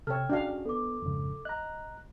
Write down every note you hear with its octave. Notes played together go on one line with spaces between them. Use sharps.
C3 A4 C#5 G5 F6
C#4 D4 F#4 G#4 F5
B3 A4 D6
F2 G#2 C#3
D#5 A#5 F#6